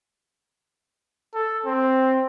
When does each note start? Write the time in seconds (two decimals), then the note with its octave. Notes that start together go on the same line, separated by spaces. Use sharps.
1.34 A4
1.66 C4